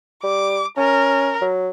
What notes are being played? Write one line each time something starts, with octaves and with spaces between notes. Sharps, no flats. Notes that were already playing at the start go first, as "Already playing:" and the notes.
G3 D6
C#4 A#4
F#3